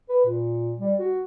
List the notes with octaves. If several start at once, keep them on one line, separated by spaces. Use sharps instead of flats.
B4
A#2
G3
F#4